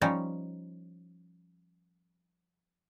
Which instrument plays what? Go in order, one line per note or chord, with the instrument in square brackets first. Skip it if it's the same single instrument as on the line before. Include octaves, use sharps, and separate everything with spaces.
[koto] F3 G3 C#4 D#4 C#5